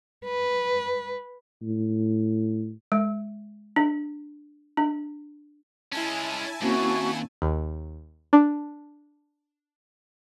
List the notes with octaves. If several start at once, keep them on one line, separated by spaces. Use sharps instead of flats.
B4
A2
G#3
D4
D4
G#3 C#4 E4 G#5 A5
D#2 A#3 C4 C#4 F#4
D#2
D4